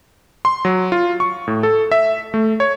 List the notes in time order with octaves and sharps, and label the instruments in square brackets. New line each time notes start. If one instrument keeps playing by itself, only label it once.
[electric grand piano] C6
F#3
F4
C#6
A2
A4
E5
A3
C#5